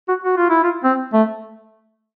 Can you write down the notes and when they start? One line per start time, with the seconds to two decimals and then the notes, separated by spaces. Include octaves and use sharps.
0.09 F#4
0.24 F#4
0.37 F4
0.50 E4
0.64 F4
0.84 C4
1.14 A3